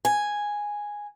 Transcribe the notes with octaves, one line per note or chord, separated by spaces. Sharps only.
G#5